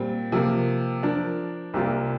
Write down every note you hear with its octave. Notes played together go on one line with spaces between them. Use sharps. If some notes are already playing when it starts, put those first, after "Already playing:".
Already playing: A#2 G3 C4
C3 F3 A#3
F3 D4 A#4
C2 C3 A#3 F4 A#4